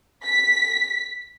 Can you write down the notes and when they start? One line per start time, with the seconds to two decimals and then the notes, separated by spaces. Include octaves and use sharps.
0.24 B6